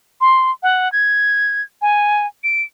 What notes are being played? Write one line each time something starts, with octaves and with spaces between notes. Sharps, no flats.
C6
F#5
G#6
G#5
D7